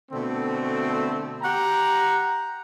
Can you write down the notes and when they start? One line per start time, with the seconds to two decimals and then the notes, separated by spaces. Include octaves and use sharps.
0.12 B2 D3 A3 C4
1.42 G4 F#5 G5 A#5